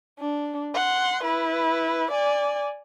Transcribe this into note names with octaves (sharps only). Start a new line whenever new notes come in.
D4
F#5 C6
E4 B4
D5 G#5